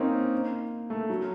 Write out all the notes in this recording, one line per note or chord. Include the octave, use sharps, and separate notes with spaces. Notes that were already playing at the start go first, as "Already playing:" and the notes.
Already playing: A#3 C4 C#4 D#4
A3
F#3